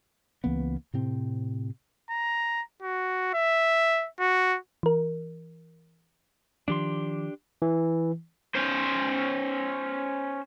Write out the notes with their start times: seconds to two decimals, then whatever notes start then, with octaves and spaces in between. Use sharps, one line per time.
0.44 C#2 E3 A#3 B3
0.94 A2 C3 C4
2.10 A#5
2.83 F#4
3.34 E5
4.20 F#4
4.83 E3 A#4
6.68 D#3 F3 D4 G4 C6
7.62 E3
8.55 C#4 C5